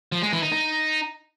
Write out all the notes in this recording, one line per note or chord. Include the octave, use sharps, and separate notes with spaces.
F3
G#3
E3
D#4
D#4